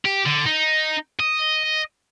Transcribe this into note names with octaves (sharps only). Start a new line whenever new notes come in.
G4
D3
D#4
D#5